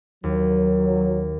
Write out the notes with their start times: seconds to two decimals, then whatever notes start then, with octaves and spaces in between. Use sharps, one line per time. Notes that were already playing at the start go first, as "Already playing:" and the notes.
0.24 D#2 F#3